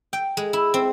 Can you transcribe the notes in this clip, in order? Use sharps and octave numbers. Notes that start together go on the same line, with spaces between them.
G5
G#3
E4
C4